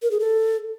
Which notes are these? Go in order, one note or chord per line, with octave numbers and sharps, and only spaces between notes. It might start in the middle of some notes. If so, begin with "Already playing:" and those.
A#4
G#4
A4